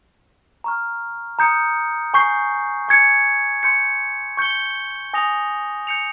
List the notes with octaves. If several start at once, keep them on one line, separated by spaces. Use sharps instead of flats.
A#5 C#6 F6
A#5 D#6 G6 C#7
G#5 C#6 G6 C7
G#5 C#6 G#6 C#7
C6 G6 C#7
C#6 G6 C#7 G7
G#5 D#6 A#6 F7
G6 C#7 F7